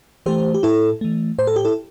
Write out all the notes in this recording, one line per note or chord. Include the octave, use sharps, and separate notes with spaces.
E3 A3 G4 C5
G4
A2 E4 A4
E3 A3
A2 C5
A4
G4
E4 A4